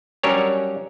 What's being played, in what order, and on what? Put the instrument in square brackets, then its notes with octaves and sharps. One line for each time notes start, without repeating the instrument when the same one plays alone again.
[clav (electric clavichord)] F#3 G3 C#4 D4 A#4 C#5